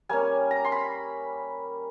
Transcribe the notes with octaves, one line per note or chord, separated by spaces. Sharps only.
G3 A#3 C#4 G#5
A#5
C6
B5